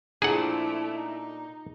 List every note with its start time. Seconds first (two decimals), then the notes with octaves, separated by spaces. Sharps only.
0.22 A#2 F3 A3 D4 E4 G#4 A4 F#5
0.94 D#4